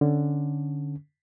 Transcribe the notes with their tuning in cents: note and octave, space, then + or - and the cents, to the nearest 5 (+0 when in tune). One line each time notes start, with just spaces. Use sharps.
D3 +0 C#4 +0